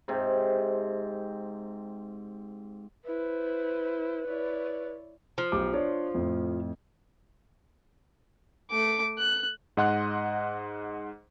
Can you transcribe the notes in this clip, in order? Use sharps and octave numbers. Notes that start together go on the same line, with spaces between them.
G#2 C3
E4 B4 C5
E4 C#5 D5
F3
B1 G4 D6
D4 C#5 D5
F2 A2
A3 D6
F#6
G#2 D#5 F#5 C6 F#6